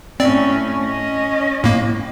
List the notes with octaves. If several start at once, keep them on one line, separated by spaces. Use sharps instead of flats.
A2 C4 C#4 D5
C#4 D#5
A2 A#3